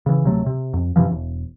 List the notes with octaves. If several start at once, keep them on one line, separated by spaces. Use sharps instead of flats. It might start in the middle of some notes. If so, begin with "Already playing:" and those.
C#3 E3
D1 C3 F#3 A3
C3
F2
F#2 C3 E3 F3
E1